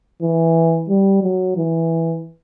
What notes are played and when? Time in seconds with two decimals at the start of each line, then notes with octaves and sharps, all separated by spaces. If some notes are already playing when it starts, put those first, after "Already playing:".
0.22 E3
0.89 G3
1.23 F#3
1.56 E3